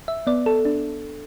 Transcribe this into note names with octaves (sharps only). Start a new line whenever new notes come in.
E5
B3 D5
A4
D4